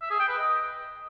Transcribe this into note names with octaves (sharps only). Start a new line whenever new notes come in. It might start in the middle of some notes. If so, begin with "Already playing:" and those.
E5
G#4
G5
B4
D#5